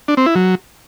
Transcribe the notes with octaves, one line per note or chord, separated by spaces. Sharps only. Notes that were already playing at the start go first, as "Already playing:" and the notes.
D4
C4
E4
F#3